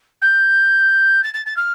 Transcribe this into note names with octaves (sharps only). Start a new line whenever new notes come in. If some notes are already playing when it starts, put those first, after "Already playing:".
G6
A6
A6
A6
F6